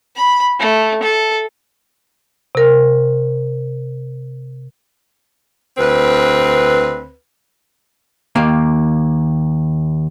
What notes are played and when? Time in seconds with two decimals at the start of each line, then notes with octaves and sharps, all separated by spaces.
0.16 B5
0.59 A3
1.03 A4
2.55 C3 A#4
5.78 D2 C4 B4
8.36 D#2 A#3 F5